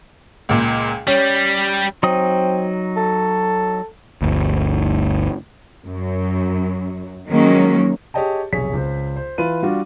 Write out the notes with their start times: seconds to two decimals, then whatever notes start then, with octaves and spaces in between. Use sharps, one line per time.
0.49 C#2 A#2
1.07 G3 C#4
2.03 F#3 C4 D#4 D#6
2.97 A4
4.22 G1 D2
5.86 F#2
7.29 D#3 F3 F#3 G#3 A#3 C#4
8.14 G4 G#4 C#5 D#5 G5 A5
8.53 F1 B1 G#4 C#5 B6
8.73 C#2 C5
9.16 C5
9.38 E3 F4 B4 D#7
9.62 G3 D4 F4 F#4